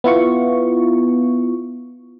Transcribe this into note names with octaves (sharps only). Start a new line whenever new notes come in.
B3 E4 F4 C#6